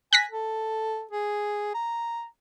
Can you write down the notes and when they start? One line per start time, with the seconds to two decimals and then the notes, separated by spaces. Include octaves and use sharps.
0.13 G#5 F#6 A#6 B6
0.32 A4
1.11 G#4
1.74 A#5